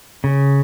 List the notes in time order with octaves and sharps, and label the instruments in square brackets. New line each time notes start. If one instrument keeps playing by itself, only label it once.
[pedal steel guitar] C#3